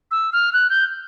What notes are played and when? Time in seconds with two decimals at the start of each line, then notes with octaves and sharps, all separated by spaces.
0.11 E6
0.33 F6
0.53 F#6
0.70 G6